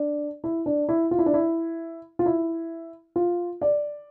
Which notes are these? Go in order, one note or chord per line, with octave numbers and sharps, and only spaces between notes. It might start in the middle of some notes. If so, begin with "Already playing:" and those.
Already playing: D4
E4
D4
E4
F4
E4
D4
E4
F4
E4
F4
D5